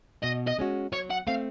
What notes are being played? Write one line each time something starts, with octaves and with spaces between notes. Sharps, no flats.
B2 D#5
D#5
G#3 C#4 F#4
F#3 C#5
F#5
A3 C4 F5